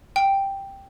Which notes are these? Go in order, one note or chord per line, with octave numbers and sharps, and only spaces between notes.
G5